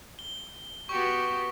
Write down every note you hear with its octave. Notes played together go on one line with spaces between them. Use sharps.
G7
B3 F#4 G4 C#6